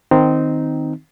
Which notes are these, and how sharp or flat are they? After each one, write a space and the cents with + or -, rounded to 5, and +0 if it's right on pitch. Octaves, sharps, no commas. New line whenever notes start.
D#3 +0 C4 -10 D#4 +0